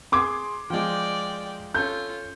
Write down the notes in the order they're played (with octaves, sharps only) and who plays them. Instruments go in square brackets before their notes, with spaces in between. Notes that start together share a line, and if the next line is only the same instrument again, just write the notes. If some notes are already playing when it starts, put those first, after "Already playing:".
[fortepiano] G#4 [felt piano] C6 D6 G#6
[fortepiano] F3 G#3 [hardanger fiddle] D5 G5
[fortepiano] C#4 A4 [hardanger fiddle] F4 [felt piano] G6